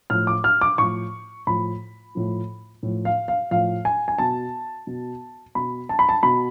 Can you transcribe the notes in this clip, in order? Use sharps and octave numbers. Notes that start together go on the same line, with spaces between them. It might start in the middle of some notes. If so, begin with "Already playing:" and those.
A2 F3 F6
D6
F6
D6
A2 F3 C#6
A2 F3 B5
A2 F3
A2 F3
F5
F5
A2 F3 F5
G#5
G#5
B2 A5
B2
B2 B5
A5
B5
A5
B2 B5